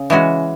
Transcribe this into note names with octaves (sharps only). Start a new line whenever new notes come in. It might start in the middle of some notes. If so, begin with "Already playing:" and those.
Already playing: C#3
E3 G#3 C#4 F#4